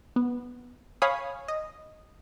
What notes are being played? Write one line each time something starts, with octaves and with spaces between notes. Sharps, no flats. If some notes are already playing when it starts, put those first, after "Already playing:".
B3
C#5 F5 G#5 B5 C#6 D#6
D#5